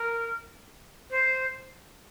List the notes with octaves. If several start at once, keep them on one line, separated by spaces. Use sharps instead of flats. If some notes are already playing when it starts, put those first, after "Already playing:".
Already playing: A#4
C5